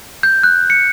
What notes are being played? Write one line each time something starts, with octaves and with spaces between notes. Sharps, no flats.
G6
F#6
C#7